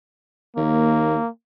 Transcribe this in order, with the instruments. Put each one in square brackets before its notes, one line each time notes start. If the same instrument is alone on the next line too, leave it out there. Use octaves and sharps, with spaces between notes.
[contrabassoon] D#2 [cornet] A#3